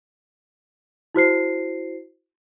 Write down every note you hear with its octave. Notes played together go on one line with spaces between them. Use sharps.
E4 F#4 C5 C7